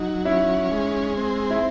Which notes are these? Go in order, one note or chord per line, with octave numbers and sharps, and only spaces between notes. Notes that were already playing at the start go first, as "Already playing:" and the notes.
Already playing: F#3 D#4
C#4 E4
G#3
C4
E4